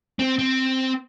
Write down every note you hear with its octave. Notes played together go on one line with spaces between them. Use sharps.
C4
C4